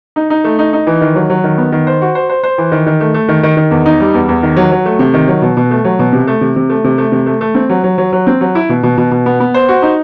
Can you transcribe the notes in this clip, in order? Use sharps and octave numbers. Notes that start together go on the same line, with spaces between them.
D#4
D#4
A3
D#4
D#4
E3
D#3
F#3
F#3
D#3
B3
D#3
C5
F#4
C5
C5
C5
E3
D#3
D#3
A3
A3
D#3
D#3
D#3
E2
D#4
G3
E2
E2
D#3
F#3
F#3
A3
C3
D#3
F#3
B2
B2
A3
F#3
B2
C3
A3
C3
C3
A3
C3
A3
C3
A3
A3
C4
F#3
F#3
F#3
F#3
C4
F#3
E4
B2
B2
B2
B2
B3
B3
C5
F#4
D#4